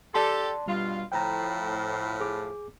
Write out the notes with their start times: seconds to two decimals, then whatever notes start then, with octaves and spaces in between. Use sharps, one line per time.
0.14 G4 A4 D5 A5 C6
0.68 G2 B2 G3 F4
1.12 A2 F3 G5 A#5
2.20 G#4 D6